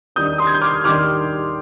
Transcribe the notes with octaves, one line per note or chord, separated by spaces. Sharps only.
D#2 D#3 G3 D4 D#6 G6
C6 D#6
G#6
G6
D6 F6
D#2 D#3 G3 D4 D6 F6